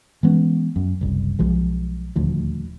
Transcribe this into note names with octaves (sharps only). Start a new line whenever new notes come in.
E3 G#3 B3 C#4
F#2
F#1 C2
B1 F3 G#3
D#1 D2 F3